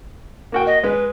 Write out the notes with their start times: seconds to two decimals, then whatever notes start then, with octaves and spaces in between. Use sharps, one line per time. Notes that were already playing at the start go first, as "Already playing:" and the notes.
0.52 A#3 F#4 G5
0.67 D#5
0.84 G#3 B4